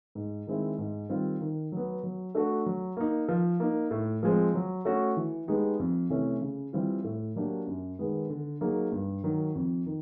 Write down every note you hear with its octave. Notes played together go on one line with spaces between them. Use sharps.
G#2
D#3 G#3 C4 E4
G#2
D#3 G3 C4 F4
D#3
F#3 B3
F#3
A3 D4 F#4 A4
F#3
A#3 D#4
F3
A#3 D#4
A2
F3 G#3 C4
F#3
A3 C#4 F#4
E3
G#3 B3 D#4 G4
F2
C3 E3 A3 C#4
C#3
E3 G3 C4 F4
A2
F#3 A#3 D4 G4
F#2
D#3 G#3 B3
D3
F#3 A#3 D#4 G#4
G2
D#3 F#3
F2
D#3